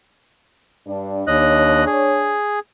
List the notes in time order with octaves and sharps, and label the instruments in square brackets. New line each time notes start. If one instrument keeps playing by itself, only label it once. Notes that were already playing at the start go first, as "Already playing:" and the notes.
[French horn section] G2 D4
[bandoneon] D#2 D#5 F#6 [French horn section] D4 C#5
[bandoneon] G#4